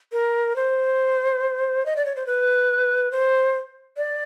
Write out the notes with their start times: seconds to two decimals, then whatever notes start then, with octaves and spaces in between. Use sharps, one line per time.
0.12 A#4
0.56 C5
1.86 D#5
1.96 D5
2.05 C#5
2.16 C5
2.27 B4
3.11 C5
3.97 D5